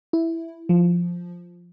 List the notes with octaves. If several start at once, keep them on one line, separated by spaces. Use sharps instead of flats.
E4
F3